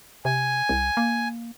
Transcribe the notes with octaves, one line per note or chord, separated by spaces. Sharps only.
C3 G#5
C2
A#3